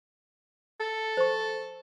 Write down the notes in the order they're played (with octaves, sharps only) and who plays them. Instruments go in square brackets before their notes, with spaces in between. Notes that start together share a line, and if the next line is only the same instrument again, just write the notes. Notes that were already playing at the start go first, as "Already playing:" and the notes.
[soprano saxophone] A4
[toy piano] C5 C#6